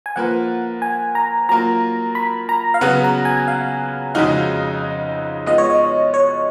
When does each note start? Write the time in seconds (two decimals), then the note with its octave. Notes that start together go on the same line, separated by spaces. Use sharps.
0.06 G#5
0.16 F3 A#3 F4 B4 F#5
0.82 G#5
1.15 A#5
1.49 F#3 A#3 F4 A#5
2.15 B5
2.49 A#5
2.74 F5
2.81 C#3 F#3 B3 F#4 B4 F#5
3.04 A#5
3.25 G#5
3.48 F5
4.15 F2 C#3 G#3 D#4 F#4 F5
5.46 G#3 B3 F4 D#5
5.58 C#5
5.70 D#5
6.14 C#5